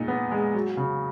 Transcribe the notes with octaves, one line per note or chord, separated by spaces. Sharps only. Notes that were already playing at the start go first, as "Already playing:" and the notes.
Already playing: A#2 G#3 D#4
B3
G#3
F#3
C#3